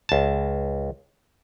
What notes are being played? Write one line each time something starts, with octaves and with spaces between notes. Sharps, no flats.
C#2 A5